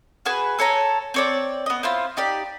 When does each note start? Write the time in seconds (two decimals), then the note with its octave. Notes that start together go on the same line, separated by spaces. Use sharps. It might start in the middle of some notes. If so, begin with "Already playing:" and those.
0.26 F#4 G#4 B4 G#5
0.59 A4 C#5 G#5 A#5
1.14 C4 C#5 D5
1.66 B3 D#5
1.83 C4 E4 F4
2.17 D#4 G4 D5